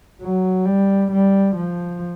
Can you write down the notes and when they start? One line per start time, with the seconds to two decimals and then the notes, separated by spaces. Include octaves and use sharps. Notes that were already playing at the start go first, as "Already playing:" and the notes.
0.22 F#3
0.66 G3
1.12 G3
1.56 F3